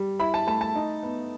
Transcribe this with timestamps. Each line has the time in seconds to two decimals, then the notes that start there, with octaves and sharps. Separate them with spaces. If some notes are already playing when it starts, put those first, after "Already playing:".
Already playing: G3
0.20 E4 B5
0.34 A5
0.47 A3 A5
0.61 A5
0.75 D#4
1.03 B3